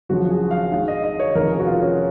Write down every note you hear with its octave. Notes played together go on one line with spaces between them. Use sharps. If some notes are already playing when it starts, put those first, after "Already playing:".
F#1 F#2 C#3 F3 F#4
G#4
F5
D#2 D#3 G#3 F5
D#5
D#5
C#5
F1 D#2 C#3 F3 A#4
G#4
F#4
F4
C#4